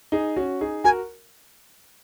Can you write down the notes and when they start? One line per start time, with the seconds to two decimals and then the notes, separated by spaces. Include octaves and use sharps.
0.12 D#4 G#4
0.36 C#4 F#4
0.61 D#4 G#4
0.84 F#4 A#4 G#5